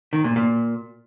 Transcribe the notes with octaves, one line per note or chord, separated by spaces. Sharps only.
D#3
A#2
A#2